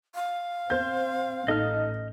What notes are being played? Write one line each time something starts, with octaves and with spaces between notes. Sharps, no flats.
F5
C4 C5 G6
A1 D#4 A4 D#5 F6